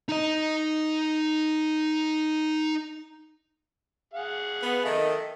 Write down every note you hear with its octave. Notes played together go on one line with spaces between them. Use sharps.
D#4 D#5
G#4 F5 F#5
B3
D#3 A4 D#5 E5